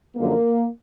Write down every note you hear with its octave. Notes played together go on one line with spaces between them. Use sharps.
F#2 D3 F3 G#3 A#3